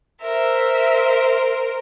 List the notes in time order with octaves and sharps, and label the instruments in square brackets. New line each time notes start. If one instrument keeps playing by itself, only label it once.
[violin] A#4 C5 [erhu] E5